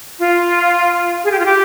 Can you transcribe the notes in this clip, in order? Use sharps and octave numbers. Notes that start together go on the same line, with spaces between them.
F4
G#4
G4
F4
G4